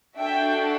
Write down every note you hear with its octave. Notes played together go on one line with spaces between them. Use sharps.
D4 F#4 A4 E5 G5